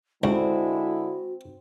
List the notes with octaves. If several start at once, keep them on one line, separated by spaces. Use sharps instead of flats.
C#2 D3 G#3 C4 E4 F#4